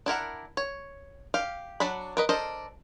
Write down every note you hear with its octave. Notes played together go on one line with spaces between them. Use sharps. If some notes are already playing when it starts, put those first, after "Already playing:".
D4 E4 A#4 F#5
C#5
G4 F5
F#3 D4 F#5 B5
A#4 B4 D#5
D4 A4 A#4 C5 D#5